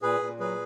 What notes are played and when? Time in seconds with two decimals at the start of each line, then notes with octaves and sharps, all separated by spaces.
0.02 A#2 G#4 B4
0.20 A#2
0.39 F#3 G#4 B4